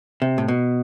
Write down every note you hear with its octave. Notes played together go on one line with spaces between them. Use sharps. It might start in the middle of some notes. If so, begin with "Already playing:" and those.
C3
A2
B2